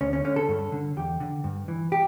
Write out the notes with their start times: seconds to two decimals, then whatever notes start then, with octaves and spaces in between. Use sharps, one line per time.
0.01 D2 C#4
0.13 C#4
0.25 D3 C#4
0.36 A4
0.49 G2
0.72 D3
0.97 E2 G4
1.20 D3
1.44 G2
1.68 E3
1.92 G4